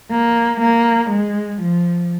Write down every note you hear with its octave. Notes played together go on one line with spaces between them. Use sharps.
A#3
A#3
G#3
F3